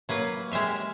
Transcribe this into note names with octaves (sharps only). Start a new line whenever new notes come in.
F#3 A#3 B4
G#3 G4 E5 F5